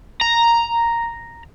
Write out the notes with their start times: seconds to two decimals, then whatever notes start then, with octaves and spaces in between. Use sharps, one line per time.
0.21 A#5